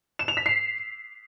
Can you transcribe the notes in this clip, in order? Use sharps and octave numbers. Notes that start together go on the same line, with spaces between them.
E7
F7
B6
C7